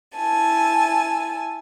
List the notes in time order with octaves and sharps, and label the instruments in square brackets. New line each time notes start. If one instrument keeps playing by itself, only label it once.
[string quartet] E4 G#5 A5